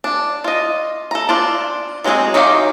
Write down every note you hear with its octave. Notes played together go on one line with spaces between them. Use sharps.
D4
F4 D#5
A4 A#5
D4 F4 C5
F#3 G#3 A#3 C4 G#4
D#3 F#3 D#4 G4 F5